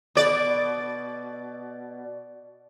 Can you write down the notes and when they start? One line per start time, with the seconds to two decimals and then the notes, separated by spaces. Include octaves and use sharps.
0.15 B2 D5